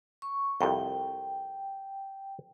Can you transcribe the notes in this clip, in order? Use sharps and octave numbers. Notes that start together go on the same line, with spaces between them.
C#6
C2 F2 G5